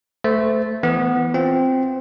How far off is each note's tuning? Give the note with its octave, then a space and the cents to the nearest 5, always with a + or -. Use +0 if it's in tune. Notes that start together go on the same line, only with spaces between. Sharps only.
A3 +0 C5 -30
E3 +0 B3 +0
C4 +0 F4 +0